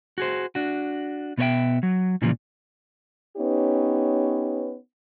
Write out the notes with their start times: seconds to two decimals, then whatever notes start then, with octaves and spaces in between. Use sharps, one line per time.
0.18 F#4 G#4 C5
0.55 D4 F#4
1.38 B2 B3 A4 C#5 E5 G5
1.83 F#3
2.22 A#2 C#3 E3 F3 G3 A#3
3.37 B3 C#4 D#4 G4 B4 C#5